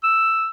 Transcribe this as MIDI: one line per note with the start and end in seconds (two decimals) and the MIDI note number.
0.04 0.50 88